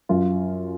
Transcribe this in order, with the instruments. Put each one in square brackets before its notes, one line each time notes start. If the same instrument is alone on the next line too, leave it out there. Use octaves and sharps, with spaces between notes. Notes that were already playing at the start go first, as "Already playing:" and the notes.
[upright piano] F#2 F4